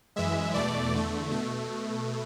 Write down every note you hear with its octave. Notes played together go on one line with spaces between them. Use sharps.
F#2 E3 G#3 E5
E2 B2 A3 D5
E2 D3 A3
B2 A3